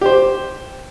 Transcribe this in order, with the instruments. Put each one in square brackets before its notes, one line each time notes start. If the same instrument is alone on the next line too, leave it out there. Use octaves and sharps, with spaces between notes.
[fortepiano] G4 C5